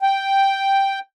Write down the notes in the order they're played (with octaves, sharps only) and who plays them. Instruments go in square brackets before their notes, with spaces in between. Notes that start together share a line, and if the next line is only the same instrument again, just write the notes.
[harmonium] G5